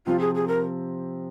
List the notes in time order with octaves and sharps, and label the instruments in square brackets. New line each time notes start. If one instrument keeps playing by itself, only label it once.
[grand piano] C3 F3 C4 [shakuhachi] F4
[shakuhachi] G#4
G#4
A#4